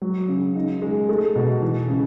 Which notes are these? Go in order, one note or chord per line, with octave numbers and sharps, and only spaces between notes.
F#3
C#3
D#4
G#3
A3
B2
E3
C#3